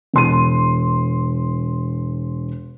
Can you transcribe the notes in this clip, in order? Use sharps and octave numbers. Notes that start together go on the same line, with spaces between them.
E1 C6 D#7